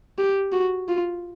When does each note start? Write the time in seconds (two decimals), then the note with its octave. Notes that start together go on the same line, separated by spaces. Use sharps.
0.18 G4
0.52 F#4
0.88 F4